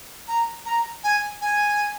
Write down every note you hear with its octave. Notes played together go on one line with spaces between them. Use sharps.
A#5
A#5
G#5
G#5